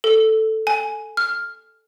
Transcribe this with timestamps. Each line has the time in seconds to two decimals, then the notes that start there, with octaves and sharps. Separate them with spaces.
0.04 A4
0.67 G#5
1.17 F6